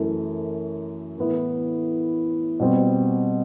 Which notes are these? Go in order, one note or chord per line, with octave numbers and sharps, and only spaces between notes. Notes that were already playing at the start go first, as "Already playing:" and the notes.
Already playing: F#2 E3 A3
A2 E3 B3 E4
B2 G3 C4